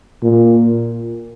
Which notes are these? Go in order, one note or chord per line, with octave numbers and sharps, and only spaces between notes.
A#2